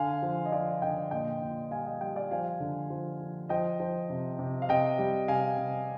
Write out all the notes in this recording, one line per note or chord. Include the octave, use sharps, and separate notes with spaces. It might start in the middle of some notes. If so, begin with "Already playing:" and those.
Already playing: D3 F5 G#5
F3
D#5
F3 D5 F5
D3 D#5 G5
A#2 D#5 G5
A#2
G3 F5 G#5
D#5 G5
G3 D#5 G5
D5 F5
F3 F5 G#5
D3
F3
F3
F3 D#5 G5
F3
C3
C3
F5
C3 D#5 G5
G3
C3 F5 G#5
C3